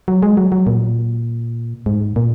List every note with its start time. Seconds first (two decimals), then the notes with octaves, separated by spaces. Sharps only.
0.08 F#3
0.23 G#3
0.37 F#3
0.52 F#3
0.67 A#2
1.86 G#2
2.16 A#2